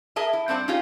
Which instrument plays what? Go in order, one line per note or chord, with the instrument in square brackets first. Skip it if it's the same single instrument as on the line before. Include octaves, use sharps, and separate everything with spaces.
[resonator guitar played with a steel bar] G#4 A#4 D#5 E5 A5
E4
G2 C4 D4 C5 F#5
C#4 D#4 F4 G4 G#4